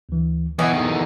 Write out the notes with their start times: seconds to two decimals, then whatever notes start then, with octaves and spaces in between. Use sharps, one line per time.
0.09 D2 E3
0.59 B2 E3 A4 C#5 E5
0.73 E2 D#3